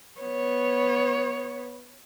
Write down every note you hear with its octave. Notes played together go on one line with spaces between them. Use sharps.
B3 C#5